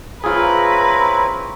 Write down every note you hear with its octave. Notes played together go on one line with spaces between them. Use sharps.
C4 C#4 E4 F4 G#4 B4 A#5